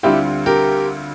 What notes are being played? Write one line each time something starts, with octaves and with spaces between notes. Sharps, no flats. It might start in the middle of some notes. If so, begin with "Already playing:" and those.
D2 D3 G3 C4 E4 F4 G4
G4 A#4